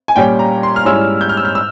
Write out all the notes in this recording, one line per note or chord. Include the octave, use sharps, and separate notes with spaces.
G#5
A#2 G3 C#4 G5
A#5
C6
F6
G#2 G3 C#4 E4 E6
G6
F6
E6
F6
E6